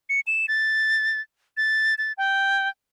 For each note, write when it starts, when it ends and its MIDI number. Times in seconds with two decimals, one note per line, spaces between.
0.09 0.20 97
0.27 0.46 100
0.48 1.20 93
1.57 1.95 93
1.98 2.13 93
2.18 2.69 79